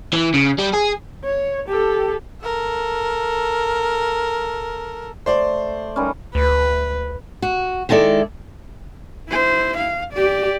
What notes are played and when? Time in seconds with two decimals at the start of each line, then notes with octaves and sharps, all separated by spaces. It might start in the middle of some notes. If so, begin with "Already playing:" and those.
0.13 E3
0.34 C#3
0.58 G3
0.73 G#4
1.24 C#5
1.69 G4 A4
2.42 A4 A#4
5.26 A3 C5 D5
5.96 D#3 G3 C#4
6.35 D2 B4
7.42 F#4
7.89 D#3 G#3 E4 A4 D5
9.29 E4 C5
9.78 F5
10.14 G4 D5